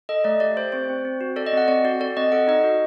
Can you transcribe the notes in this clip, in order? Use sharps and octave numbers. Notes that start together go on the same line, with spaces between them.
A4 D#5
A3 D5
G4 D5
G4 C5
C4 C5
C4
C4
F#4
A4 D5
D#5
C4 F#5
C4 D5
F#4 D5
A4 D5
C4 D#5
A4 F#5
D#4 D#5
F#4